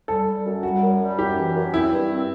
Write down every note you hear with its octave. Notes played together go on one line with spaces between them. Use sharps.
G3 A4
G3
F#2
G3 F#4
F#2
G3
F#2 G4
E3
F#2
C4 E4
G2
C4